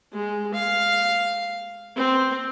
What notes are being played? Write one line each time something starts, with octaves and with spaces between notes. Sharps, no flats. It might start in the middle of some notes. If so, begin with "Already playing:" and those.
G#3
F5
C4